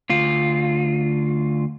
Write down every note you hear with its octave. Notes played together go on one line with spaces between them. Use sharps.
D2 F4